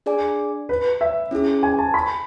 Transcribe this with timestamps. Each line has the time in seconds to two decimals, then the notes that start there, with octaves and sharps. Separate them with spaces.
0.06 D4 G#4 D5 G#5
0.69 B4
1.01 E5
1.31 C#4 E4 G#4
1.63 G#5
1.79 A5
1.94 B5